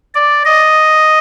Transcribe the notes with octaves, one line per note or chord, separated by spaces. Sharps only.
D5
D#5